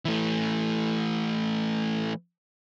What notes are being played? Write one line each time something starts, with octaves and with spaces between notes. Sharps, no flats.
E3 A3